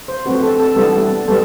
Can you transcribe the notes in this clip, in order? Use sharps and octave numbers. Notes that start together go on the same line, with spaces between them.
C5
A3 C4 F#4 B4
A4
A4
G3 B3 E4 A4
G3 B3 A4